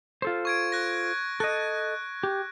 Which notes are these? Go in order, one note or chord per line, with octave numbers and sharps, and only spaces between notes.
F4 A4 C5
C#6 G#6 D7
F#6 A#6
A4 D#5 F#6
G4